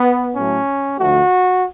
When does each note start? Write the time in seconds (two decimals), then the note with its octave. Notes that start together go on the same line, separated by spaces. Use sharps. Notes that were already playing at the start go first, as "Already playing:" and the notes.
Already playing: B3
0.36 A2 F#3 A3 C#4
0.99 D2 D3 F3 A3 F#4